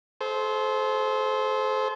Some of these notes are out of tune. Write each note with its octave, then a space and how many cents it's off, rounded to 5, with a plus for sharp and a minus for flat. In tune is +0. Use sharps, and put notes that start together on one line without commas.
A4 -35 C5 +0